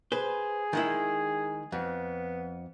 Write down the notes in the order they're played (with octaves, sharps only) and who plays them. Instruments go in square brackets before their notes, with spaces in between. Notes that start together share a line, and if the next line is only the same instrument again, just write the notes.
[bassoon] G#4 [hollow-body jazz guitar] B4 C5
[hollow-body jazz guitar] D#3 G#3 E4
[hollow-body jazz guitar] F2 [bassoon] B3